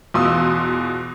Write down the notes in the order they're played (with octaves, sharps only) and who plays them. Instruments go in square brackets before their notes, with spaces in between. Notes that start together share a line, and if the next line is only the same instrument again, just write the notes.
[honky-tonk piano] E2 B2 F4 C6 D#6 E6